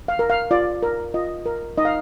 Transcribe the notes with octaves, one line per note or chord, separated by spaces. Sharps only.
F5
A#4
F5
F4 D5
A#4
F4 D#5
A#4
D#4 D#5
F5